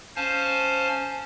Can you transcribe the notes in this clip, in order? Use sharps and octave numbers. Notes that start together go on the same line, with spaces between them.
C#4 C5 F5 G#5 A5